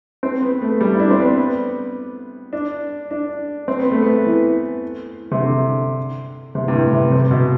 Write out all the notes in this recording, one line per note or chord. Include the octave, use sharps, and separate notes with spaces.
C4
B3
A3
G3
E4
D4
C4
B3
D4
D4
C4
B3
A3
B3
E3
C3
D3
C3
G2
A2
C3
C3
B2